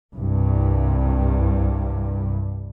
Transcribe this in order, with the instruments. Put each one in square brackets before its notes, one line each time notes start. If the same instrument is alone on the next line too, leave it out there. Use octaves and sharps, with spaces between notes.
[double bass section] C2 G2